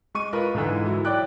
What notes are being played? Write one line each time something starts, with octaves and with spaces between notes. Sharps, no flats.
G#3 C#6 D#7
F4 A#4 B4 D#5
G#2 D3 E3
F#3 E4
C#5 D5 G5 D6 F#6